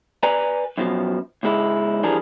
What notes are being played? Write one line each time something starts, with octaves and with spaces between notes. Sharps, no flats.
B4 D5 G#5 A#5
F#2 B2 F3
C#2 G#2 G#3 E4
E3 F3 G3 D4 G#4 A#4